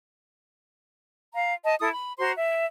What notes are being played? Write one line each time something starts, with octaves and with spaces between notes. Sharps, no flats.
F5 A#5
D#5 A5
E4 A4 D#6
B5
F#4 C5 A#5 C6
E5